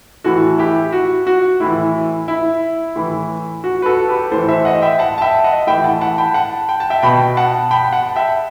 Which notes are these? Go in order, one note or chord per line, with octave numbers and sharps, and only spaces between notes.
A2 E3 F#4 A4
E4 G4
F#4
F#4
A2 E3 E4
E4
A2 E3
F#4
B4
F#4 A4
G4 B4
A2 E3 A4 C5
C5 E5
D#5 F#5
E5 G5
F#5 A5
A5
E5 G5
D#5 F#5
A2 E3 E5 G5
F#5 A5
F#5 A5
G5 B5
F#5 A5
G5
A5
E5 G5
B2 G5 B5
F#5 A5
G5 B5
F#5 A5
E5 G5